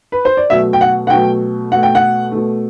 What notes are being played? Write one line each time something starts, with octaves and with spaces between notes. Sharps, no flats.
B4
C5
D5
B2 F#3 A3 E5
G5
F#5
F#5
B2 F#3 A3 G5
B2 A3 F#5
G5
F#5
B2 A3